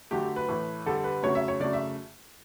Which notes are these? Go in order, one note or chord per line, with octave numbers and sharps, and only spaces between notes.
D3 F#3 A3 G4
B4
A2 E3 A3
D3 G3 A4
B4
C#3 F#3 A3 C#5
E5
C#5
C#3 F#3 A3 D5
E5